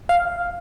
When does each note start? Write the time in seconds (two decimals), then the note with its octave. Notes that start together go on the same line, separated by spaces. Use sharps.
0.09 F5